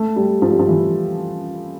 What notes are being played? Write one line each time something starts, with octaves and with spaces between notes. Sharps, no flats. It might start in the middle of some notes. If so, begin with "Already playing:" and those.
Already playing: A3
G3
F3
G3
F3
E3